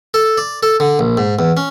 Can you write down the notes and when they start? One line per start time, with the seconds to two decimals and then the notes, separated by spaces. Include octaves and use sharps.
0.14 A4
0.38 D5
0.63 A4
0.80 D3
0.99 A#1
1.17 G#2
1.39 E2
1.57 C#4